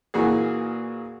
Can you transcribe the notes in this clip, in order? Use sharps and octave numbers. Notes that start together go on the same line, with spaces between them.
A#2 E3 A#3 F#4 G#4